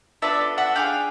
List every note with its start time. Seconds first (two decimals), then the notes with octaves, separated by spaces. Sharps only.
0.22 B3 D4 F4 A4 D5 E5
0.58 E5 F#5
0.76 D4 F4 G#4 F5 G5